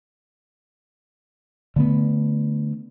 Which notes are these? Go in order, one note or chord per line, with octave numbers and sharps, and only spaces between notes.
D3 A3 B3